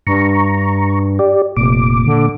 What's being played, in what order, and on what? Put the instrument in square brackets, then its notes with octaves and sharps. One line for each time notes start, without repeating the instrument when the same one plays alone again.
[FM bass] G2 [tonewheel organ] A#5 C#6
[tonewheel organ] G4 D5
[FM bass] F1 [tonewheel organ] A#2 D6
[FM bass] D3